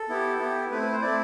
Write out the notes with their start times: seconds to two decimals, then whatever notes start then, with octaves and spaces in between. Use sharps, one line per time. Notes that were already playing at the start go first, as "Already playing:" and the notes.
Already playing: A4
0.09 B3 E4 G4
0.39 B3 E4 G4
0.71 A3 C4 E4 B4
0.82 B4
0.92 C5
1.02 A3 C4 E4 D5